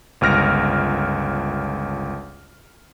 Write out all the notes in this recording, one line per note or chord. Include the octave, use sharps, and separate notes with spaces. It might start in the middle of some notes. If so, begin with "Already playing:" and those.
G1 C#2 F6 A#6 D7